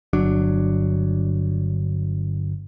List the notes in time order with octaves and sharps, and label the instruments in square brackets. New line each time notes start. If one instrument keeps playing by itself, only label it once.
[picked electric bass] G1 F#3 D4